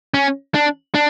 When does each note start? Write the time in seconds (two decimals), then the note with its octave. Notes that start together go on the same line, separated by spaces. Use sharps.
0.14 C#4
0.54 D4
0.95 D4